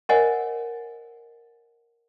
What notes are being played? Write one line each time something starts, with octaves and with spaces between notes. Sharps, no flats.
A#4 C5 C#5 D#5 F#5 G#5